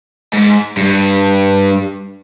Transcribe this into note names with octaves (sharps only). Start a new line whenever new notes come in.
G#2
G2